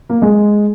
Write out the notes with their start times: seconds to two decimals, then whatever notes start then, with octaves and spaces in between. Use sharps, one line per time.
0.09 A#3
0.22 G#3